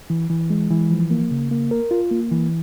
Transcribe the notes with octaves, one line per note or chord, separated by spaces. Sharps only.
E3
E3
G#3
E3
F3
A#3
C#3
A#3
A#4
F4
A#3
E3